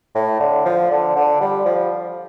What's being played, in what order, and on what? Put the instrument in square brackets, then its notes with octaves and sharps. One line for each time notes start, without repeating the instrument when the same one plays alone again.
[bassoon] A2
D3
F3
D3
D3
G3
F3